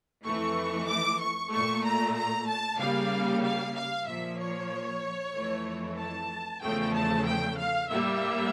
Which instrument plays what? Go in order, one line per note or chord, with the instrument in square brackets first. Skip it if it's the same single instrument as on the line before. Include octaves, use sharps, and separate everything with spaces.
[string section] F2 E3 A3 C#6
D6
C#6
A#2 A3 C#6
A#5
A#5
A5
C#3 G3 A#3 F5
F5
F5
A#2 F3 A#3 E5
C#5
F2 E3 A3
A5
E2 C#3 F3 A3 G5
A5
G5
F5
A2 G3 A#3 E5